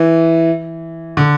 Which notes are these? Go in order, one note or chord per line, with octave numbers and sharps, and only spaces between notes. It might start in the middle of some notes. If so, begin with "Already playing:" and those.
Already playing: E3
D3